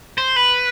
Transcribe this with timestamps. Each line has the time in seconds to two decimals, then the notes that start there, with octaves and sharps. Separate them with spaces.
0.18 C5
0.36 B4